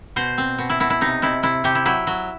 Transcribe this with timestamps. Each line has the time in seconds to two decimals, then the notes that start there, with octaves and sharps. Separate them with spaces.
0.16 B2 C5
0.38 C4
0.58 B2
0.70 E4
0.80 B2 E4
0.90 E4
1.01 C3 D#4
1.22 C3 E4
1.43 C3 E4
1.64 C3 G4
1.75 E4
1.85 F#3 E4
2.07 F#3